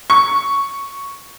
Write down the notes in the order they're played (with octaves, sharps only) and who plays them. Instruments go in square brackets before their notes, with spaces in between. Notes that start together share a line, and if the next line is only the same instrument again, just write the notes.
[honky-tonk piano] C#6